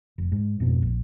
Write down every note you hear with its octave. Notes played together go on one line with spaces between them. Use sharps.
F1
G#2
F2 G#2 B2
A#1